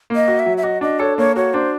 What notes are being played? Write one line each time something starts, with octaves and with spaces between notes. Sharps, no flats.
A#3
D#5
F#4
E5
F#3
E5
F#4 D#5
D4 D#5
A4 C#5
A#3 C#5
F#4 C#5
D4 C5